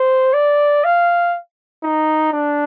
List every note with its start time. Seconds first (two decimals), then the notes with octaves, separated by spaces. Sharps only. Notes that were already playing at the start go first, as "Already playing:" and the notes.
Already playing: C5
0.33 D5
0.84 F5
1.83 D#4
2.33 D4